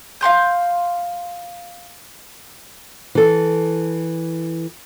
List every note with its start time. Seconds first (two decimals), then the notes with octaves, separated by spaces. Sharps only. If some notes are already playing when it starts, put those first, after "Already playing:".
0.21 F5 F#5 C6 G6
3.15 E3 A4